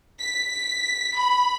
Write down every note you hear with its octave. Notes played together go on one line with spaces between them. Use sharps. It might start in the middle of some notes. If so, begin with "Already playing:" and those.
B6
B5